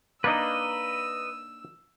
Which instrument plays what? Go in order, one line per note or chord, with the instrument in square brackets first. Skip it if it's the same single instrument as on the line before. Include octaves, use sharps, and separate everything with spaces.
[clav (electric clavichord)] A#3 D4 D#4 [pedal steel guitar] B4 D#5 [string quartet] E6